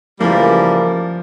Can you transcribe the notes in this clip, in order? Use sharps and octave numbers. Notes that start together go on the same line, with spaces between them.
C#3 E3 F3 G3 A#3